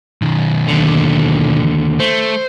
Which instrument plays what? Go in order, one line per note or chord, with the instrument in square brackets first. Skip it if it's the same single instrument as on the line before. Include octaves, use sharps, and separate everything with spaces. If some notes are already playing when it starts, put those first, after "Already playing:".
[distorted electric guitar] B1 D#3
[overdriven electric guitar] D#2 D3
[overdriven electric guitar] A3 [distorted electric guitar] C5